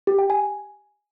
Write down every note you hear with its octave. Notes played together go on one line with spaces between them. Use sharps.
G4
G5
G#5